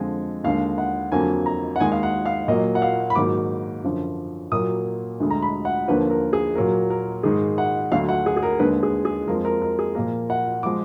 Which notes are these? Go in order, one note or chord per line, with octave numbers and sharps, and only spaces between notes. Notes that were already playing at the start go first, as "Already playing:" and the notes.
Already playing: F2 D3 F3 G#3 G#5
D#2 D3 G#3 F5
F#5
F2 D3 F#3 A#3 G#5
A#5
F#5
D#2 D#3 G#3 G#5
F5
F#5
F5
A#2 F#3 A#3 D#5
F#5
F5
B5
G#2 D#3 F#3 A#3 D6
F#2 D3 F3
A#2 F#3 A#3 D#6
D2 D3 G#3
A#5
B5
F#5
D#2 D3 F3 A#3 B4
A#4
G#4
A#2 F#3 A#3 A#4
A#4
G#2 D#3 G#3 G#4
F#5
D2 D3 F#3 F5
F#5
G#4
G#4
A#4
D#2 D3 G#3 B4
G#4
G#4
F2 F3 G#3 A#4
A#4
A#4
G#4
A#2 F3 A#3 A#4
F#5
F3 G#3 D6